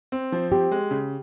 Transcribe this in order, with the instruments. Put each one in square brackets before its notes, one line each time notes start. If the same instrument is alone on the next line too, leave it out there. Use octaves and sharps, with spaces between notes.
[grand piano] C4
F3
[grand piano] C4 [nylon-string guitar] G4
[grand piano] G#3
C#3